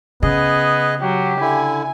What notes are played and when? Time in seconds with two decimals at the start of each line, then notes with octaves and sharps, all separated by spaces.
0.23 C#3 B3 G#4 D#5
1.01 F#3 G4
1.41 D3 E4 G#5